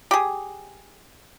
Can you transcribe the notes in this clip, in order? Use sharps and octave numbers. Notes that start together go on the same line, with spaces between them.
G4 G#4